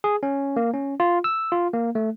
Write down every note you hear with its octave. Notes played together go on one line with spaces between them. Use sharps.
G#4
C#4
A#3
C#4
F4
E6
F4
A#3
A3